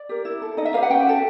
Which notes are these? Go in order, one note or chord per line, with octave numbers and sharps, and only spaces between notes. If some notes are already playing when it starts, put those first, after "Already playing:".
Already playing: D5
G4 A#4
E4
A4
D#4 D#5
E5
G4 B4 F5
F#5
C#4 G5
F#4 A4